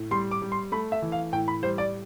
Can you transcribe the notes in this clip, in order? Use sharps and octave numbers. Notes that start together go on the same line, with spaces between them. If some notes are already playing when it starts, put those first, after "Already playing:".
Already playing: A2
G3 C6
D6
G3
C6
A3 B5
E5
E3
F5
A2 G5
B5
G3 C5
D5